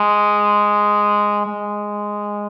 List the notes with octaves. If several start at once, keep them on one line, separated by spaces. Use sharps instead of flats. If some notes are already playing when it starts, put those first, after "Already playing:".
Already playing: G#3
G#3